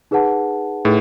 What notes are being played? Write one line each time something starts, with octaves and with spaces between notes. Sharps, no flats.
D#4 G#4 B4 F#5 A5
A2 D#4 G#4 B4